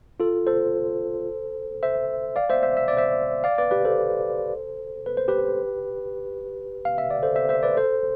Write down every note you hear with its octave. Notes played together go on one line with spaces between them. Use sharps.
F4 A4
A4 C5
C5 E5
D5 F5
C5 E5
C5 E5
E5
D5
C5 E5
D5 F5
B4 D5
G4 B4
A4 C5
B4
C5
G4 B4
F5
E5
D5
A4 C5
C5 E5
C5 E5
B4 D5
A4 C5